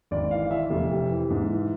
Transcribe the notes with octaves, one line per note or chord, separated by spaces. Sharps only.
G#1 D5
E3 F5
E3 E5
F1
C3
E3
G#2
E3